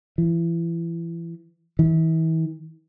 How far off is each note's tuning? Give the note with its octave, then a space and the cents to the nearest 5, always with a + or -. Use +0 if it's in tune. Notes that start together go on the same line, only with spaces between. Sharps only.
E3 +25
E3 -35